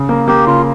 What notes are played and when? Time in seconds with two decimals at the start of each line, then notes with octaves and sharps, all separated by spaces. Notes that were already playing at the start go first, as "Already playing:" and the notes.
Already playing: C#3
0.09 A#3
0.28 A#3 G4
0.47 C#3 F4